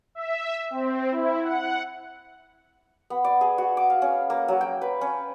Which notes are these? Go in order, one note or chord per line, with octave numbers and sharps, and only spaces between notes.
E5
C4
E4
F#5
B3
D5
G#4
F#4
D6
F5
C#4
A#3
F#3
G5
B4
C#4